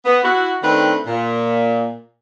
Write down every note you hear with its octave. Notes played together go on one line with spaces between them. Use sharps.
B3
E4 F#4
D#3 A3 C4 D4 B4
A#2